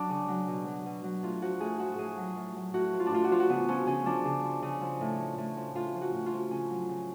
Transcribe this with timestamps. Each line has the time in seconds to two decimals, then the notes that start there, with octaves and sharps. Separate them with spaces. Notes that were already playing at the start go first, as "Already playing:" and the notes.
Already playing: F#3 D4
0.10 C#3
0.29 F#3
0.48 B2
0.67 F#3
0.86 B2
1.04 F#3
1.23 A2 F4
1.42 F3 F#4
1.60 A2 G#4
1.79 F3 F#4
1.98 A2 G#4
2.18 F#3
2.36 A2
2.56 F#3
2.74 A2 F#4
2.93 F3
3.00 F4
3.06 D4
3.12 A2 F4
3.24 F#4
3.31 F3 F4
3.40 F#4
3.50 C#3 B3
3.68 F3 C#4
3.87 C#3 C#4
4.06 F3 D4
4.25 C#3
4.44 F3
4.62 C#3
4.82 F3
5.01 A2
5.19 F3
5.38 A2
5.57 F3
5.75 A2 F4
5.95 F3
6.01 F#4
6.14 A2
6.26 F4
6.32 F3
6.51 C#3 C#4
6.70 F#3
6.89 C#3